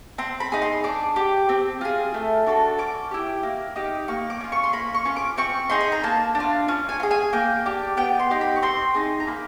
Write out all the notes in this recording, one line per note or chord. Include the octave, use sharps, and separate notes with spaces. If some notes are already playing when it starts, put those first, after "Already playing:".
C4 C6
B5
D#4 G#4
C6
D4 D6
G4
C4
F4 G#4
A3
D4 F#4 A4
C#4 D6
E4 G4
A#3
D#4 G4
A#3 C#6
D6
C#4 F4
C#6
C6
A#3 B5
C#6
C#4 F4
D6
C4 C#6
D#4 G#4 C6
B5
A#5
A#3 A5
D4
F4
C#4
G#5
F4
G#4
G#5
A#3 G5
D4 G4
B3 G5
C6
D#4 G4
B5
C#6
C4 C6
D#4 G#4
A#5
A#3 B5